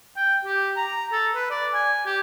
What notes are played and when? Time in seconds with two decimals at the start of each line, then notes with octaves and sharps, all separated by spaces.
0.17 G5
0.45 G4
0.77 A#5
1.12 A4
1.36 B4
1.51 D5
1.74 G#5
2.06 G4